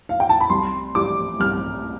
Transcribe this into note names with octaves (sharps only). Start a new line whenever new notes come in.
F5
G5
A5
B5
C2 C6
G3 D6
C2 F6